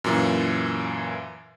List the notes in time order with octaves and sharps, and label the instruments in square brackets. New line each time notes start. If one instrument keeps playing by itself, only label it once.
[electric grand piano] F#2 A#2 E3